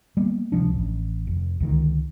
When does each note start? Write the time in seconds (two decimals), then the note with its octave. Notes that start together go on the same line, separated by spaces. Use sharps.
0.17 G3 A#3 B3
0.52 C#2 C3 F3 D4
0.74 A1
1.27 F1
1.60 C#2 D3 D#3